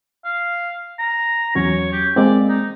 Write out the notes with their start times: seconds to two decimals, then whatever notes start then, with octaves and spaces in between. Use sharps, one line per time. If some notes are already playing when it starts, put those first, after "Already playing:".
0.25 F5
0.99 A#5
1.55 E2 F#3 C#4 C#5
1.92 G4
2.16 G#3 A#3 C4 D5
2.49 D#4